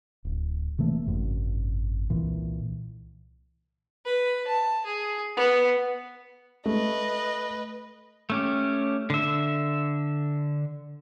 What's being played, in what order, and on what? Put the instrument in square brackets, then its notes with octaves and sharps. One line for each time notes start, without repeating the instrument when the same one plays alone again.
[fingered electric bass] D1
C3 E3 A3 A#3
G#1 F#2 C3
C2 A#2 E3
[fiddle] B4
A5
G#4
B3
[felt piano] A3 [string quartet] B4 D#5
[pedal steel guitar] A3 C#4 G4
D3 E5